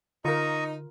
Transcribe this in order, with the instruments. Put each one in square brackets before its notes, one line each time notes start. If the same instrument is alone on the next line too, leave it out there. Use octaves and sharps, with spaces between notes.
[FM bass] D3 [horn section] D#4 [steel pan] F4 A#4 [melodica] A#5 C#6 D#6